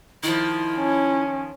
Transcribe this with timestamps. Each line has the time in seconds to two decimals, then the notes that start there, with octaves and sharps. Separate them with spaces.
0.23 D#3 F3 E4
0.78 C#4